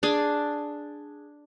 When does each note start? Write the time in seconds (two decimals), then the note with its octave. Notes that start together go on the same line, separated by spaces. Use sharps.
0.03 D4 G#4